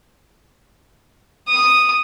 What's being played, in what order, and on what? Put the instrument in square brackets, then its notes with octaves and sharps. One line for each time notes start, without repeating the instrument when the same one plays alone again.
[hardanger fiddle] D#6